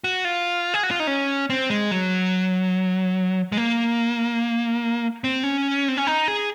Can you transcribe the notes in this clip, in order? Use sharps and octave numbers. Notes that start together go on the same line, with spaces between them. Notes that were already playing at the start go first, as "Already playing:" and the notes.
F#4
F4
G#4
F#4
F4
D#4
C#4
C4
G#3
F#3
G#3
A#3
C4
C#4
C4
C#4
D#4
G#4